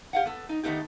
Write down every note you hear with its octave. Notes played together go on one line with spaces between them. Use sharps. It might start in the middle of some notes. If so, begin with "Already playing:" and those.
G4 F5 F#5
B3 A4
D#4
D#3 A3 B3 D#4 G4